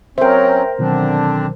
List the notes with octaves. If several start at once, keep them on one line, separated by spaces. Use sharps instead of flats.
F#3 C4 C#4 A#4 C5 E5 G5
B2 D3 D#3 F#3 C4 D4